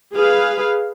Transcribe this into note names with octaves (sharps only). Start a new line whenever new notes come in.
G#4 B4 F5